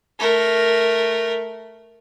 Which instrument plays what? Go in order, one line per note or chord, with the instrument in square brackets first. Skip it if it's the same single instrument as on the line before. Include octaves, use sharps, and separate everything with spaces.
[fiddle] A3 A#4